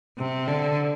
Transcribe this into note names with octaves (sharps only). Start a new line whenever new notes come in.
C3
D3